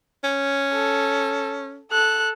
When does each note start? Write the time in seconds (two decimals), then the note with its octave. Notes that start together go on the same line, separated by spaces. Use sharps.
0.24 C#4
0.72 A4
1.91 A4 F#6